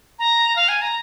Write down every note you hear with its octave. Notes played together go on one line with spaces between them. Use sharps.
A#5
F5
G#5
A#5